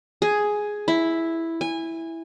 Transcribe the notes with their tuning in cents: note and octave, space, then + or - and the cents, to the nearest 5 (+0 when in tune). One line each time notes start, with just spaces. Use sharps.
G#4 +5
E4 +0
G#5 -20